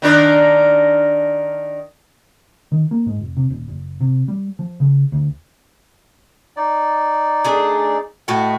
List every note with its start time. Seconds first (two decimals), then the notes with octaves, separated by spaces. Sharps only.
0.02 D#3 D4 A#4
2.72 D#3
2.91 A#3
3.06 G#2
3.20 F1
3.37 C3
3.50 D#1
3.68 F#1
4.00 C3
4.28 G3
4.59 F3
4.80 C#3
5.12 D2
6.57 D#4 D5
7.44 A3 D4 G#4
8.28 A2 A3 F#4 D#5